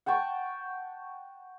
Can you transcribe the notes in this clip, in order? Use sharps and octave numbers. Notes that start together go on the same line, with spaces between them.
F#5 G5 A5 C#6